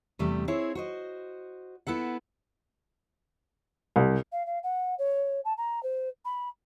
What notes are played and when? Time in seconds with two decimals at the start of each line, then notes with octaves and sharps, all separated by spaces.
0.19 E2 C3 G3 A3 G4
0.48 C4 E4 G#4 C#5
0.75 F#4 C5 D#5
1.87 B3 E4 A4 F#5
3.96 C2
4.32 F5
4.46 F5
4.63 F#5
4.98 C#5
5.44 A5
5.57 A#5
5.83 C5
6.25 B5